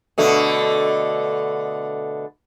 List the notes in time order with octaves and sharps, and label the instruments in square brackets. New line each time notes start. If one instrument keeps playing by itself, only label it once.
[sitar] B2 D3 A3